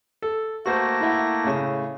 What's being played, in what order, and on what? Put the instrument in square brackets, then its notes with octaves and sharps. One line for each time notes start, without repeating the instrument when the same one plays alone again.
[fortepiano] A4
[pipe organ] A3 A#3 A#6 [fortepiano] F#4 C5
[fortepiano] E4 E5 F#5
A2 C#3